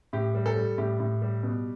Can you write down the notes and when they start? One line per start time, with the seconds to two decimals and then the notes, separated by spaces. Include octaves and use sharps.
0.13 A2 G4
0.35 G3
0.46 A4
0.56 G3
0.78 A2 G4
1.00 A2
1.22 G3
1.43 B2